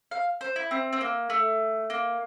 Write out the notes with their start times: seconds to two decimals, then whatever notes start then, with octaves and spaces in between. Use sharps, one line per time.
0.11 F5
0.41 C5
0.56 E4
0.71 C4
0.93 C4
1.01 A#3
1.30 A3
1.90 A#3